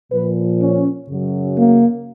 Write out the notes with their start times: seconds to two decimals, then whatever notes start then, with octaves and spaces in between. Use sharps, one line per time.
0.11 A#2 F3 B4
0.60 C#4
1.08 F#2 C#3 F#3
1.56 A#3